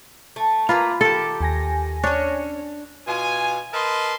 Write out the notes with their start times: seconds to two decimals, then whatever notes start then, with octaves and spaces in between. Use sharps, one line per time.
0.36 A3
0.69 A#3 F4 B4 A#5 B5
1.01 D#3 G4 A4
1.40 D#2 G#5 A#6
2.03 C#4 D4 C#5
3.08 B2 F4 G#5
3.73 A#4 B4 D#5 A5 C6